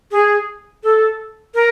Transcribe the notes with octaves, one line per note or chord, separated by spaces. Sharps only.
G#4
A4
A#4